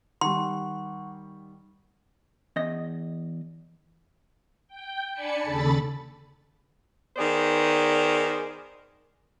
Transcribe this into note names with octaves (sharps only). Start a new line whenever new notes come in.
D#3 G3 F#5 C6 C#6
E2 D#5
G5
D4 D5 G#5 A5 B5 C#7
D#2 C#3 A4 B5 A6
D#3 B3 G#4 C5 D5